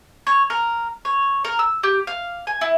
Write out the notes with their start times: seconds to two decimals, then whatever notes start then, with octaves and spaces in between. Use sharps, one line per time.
0.27 C#5
0.50 A#4
1.05 C#5
1.45 A#4
1.59 E6
1.83 G4
2.07 F5
2.47 G#5
2.61 E4